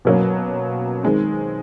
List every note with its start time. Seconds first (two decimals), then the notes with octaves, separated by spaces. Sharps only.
0.05 B2 F#3 A#3 C#4
1.03 D#3 G#3 C4